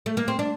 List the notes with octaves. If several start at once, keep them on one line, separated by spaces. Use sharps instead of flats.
A3
A#3
C4
D4